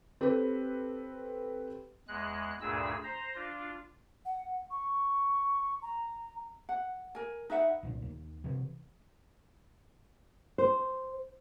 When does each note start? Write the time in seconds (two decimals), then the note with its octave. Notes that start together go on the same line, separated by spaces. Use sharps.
0.21 C4 G4 A4 B4
2.08 E2 G#3 F#6
2.61 D2 G2 A#2 D4 G#4 E6
3.04 C5 A#5
3.35 D4 F4
4.25 F#5
4.71 C#6
5.82 A#5
6.69 F#5
7.15 A#4 G#5
7.50 D#4 B4 E5 F#5
7.83 C2 A#2
8.02 D#2
8.44 C3 E3
10.58 C5